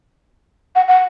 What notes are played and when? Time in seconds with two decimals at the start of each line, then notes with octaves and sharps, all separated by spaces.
0.75 F#5
0.88 F#5